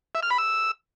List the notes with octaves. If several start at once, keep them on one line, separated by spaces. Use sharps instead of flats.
E5
F6
B5
E6